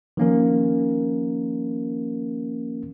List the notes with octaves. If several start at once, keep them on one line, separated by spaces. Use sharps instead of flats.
D#3 F3 A#3 C#4 A#4